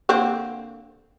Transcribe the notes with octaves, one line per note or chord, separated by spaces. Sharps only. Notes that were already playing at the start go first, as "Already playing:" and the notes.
D3 A#3 C4